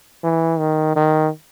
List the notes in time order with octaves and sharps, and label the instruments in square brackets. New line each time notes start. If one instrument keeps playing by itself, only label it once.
[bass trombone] E3
D#3
D#3